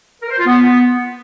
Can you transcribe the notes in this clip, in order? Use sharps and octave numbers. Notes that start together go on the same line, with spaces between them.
A#4
C5
F4
B3